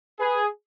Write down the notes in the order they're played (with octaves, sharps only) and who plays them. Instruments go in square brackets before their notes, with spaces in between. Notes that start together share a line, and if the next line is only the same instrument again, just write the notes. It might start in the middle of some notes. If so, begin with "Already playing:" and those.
[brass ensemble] G#4 [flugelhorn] B4